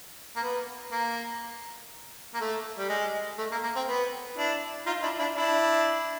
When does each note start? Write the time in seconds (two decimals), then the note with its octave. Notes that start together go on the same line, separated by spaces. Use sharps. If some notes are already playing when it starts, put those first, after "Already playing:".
0.36 A#3
0.43 B3
0.92 A#3
2.34 A#3
2.41 A3
2.78 G3
2.89 G#3
3.38 A3
3.51 A#3
3.63 A#3
3.76 C4
3.88 B3
4.37 D4 E4
4.86 D#4 F4
5.02 D4 E4
5.19 D4 E4
5.36 D4 E4